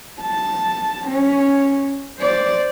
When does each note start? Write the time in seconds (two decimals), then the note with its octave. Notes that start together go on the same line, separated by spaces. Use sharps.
0.21 A5
1.07 C#4
2.19 C5 D5